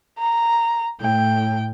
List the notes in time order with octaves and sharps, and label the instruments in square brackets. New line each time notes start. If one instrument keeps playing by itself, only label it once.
[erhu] A#5
[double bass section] A2 [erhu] G5